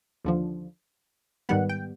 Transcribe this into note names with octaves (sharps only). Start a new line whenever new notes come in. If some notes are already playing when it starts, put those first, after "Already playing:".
D#2 D3 F3
G#2 D#3 G3 B3 F#5
G5